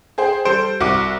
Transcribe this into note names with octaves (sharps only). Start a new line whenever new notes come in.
G#4 C5 G5
G3 A4 C5 D7
C2 F#4 D6